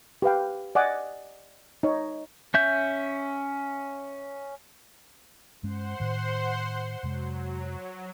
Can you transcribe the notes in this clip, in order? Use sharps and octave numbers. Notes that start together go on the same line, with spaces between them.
G4 B4 F5 G5
D5 D#5 F#5 G#5 D6
D#4 C#5
C#4 E5 G6
G2 G#3 C#4 C5 F#5 C6
A2 D#3
F2 C3 F#3 G#3